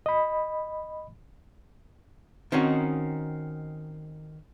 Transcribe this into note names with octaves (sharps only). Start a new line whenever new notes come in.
D#5 B5
D#3 C4 C#4 D#4 F#4